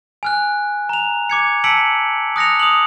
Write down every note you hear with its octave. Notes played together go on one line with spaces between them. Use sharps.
G#5 F6 F#6
A#5 F7
D6 G#6 C#7
A5 E6 B6 C#7 D7 F#7
D#6 F#6 A#6 C#7 F7
D#6 F7 F#7